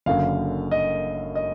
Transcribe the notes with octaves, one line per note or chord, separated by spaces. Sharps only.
F#1 F#2 D3 F5
D#5
D#5